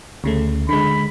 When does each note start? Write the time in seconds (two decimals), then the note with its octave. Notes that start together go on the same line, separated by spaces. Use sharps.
0.24 D2 C#3 A3
0.69 D3 G#3 B5